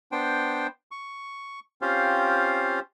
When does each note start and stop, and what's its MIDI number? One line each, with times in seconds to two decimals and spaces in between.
0.12 0.67 59
0.12 0.67 62
0.12 0.67 72
0.12 0.67 79
0.91 1.60 85
1.82 2.80 60
1.82 2.80 61
1.82 2.80 65
1.82 2.80 67
1.82 2.80 72
1.82 2.80 77